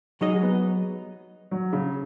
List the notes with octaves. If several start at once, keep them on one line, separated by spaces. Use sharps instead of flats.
F#3 G#3 D#4 G#4 D#5
G#3
B3
F#3
C#3